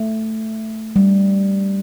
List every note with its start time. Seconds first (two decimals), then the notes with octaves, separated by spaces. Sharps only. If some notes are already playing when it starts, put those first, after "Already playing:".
Already playing: A3
0.96 G3